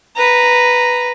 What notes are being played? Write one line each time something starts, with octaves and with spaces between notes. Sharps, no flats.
B4 A#5